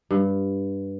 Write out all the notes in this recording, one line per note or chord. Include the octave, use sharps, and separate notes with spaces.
G2